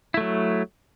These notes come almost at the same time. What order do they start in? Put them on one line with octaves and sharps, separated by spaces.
E4 A3 F#3